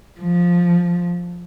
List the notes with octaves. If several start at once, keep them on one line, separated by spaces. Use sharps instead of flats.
F3